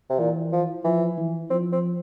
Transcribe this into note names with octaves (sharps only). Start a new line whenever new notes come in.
C3
A#2 E3
F3
E3 F3
E3
F3 C4
C4